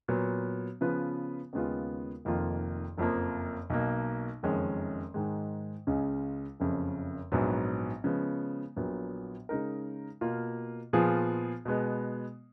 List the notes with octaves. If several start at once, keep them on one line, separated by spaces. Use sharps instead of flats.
A#2 F#3 B3
C#3 F3 B3 F4 B4
D#2 C#3 G#3 B3 F4
F1 F2 D#3 A#3 F4
F#1 F2 F3 A#3
B1 B2 A#3
F#1 F2 D#3 G#3 C#4
G#2 D#3 G#3
C#2 C#3 G#3 C#4
F#1 F2 C#3
A#1 G#2 F#3 B3
C#3 F3 G#3 B3
A#1 A#2 F#3 B3
C#3 G#3 D#4 A#4
B2 A#3 F4
A#2 F3 B3 F4 G#4
B2 G#3 B3